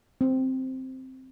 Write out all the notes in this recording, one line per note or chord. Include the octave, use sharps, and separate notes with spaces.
C4